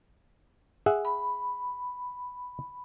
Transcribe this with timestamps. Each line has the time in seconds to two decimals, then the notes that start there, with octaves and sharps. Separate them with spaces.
0.86 G#4 E5 F#5
1.05 B5